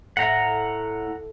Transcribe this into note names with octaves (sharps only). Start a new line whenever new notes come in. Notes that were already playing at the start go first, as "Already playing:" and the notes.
A2 F#5 A#5